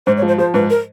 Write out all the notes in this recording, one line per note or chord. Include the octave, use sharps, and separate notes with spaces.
G#2 C5
C#5
F3
C5
F3 C5
G#2 B4
A#4